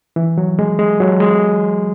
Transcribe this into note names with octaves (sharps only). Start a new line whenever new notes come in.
E3
F#3
G#3
G#3
F#3
G#3